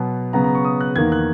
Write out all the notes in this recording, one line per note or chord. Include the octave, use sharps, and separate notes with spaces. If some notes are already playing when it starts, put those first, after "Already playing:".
Already playing: B2 F#3 B3
C#3 F#3 B3 A#5
A#5
C#6
D#6
F#6
E2 D#3 A#3 G#6
F#6